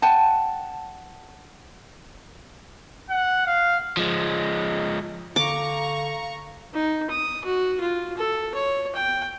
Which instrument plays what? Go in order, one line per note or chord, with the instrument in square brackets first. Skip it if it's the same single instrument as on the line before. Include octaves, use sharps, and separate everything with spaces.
[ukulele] F#5 G5 A5
[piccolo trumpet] F#5
F5
[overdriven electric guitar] F3 G#3
[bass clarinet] D3 [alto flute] F5 [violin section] A#5 C#6 [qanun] D6
[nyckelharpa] D#4
D#6
F#4
F4
A4
C#5
G5